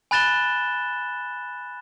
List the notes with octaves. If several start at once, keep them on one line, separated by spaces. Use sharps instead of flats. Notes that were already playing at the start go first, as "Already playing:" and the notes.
G#5 B5 F#6 A6 E7 G7